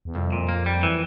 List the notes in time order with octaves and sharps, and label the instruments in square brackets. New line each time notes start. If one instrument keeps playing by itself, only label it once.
[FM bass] E2
[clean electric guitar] C2 [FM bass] F2
[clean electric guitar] A#2
A#3
G3
E3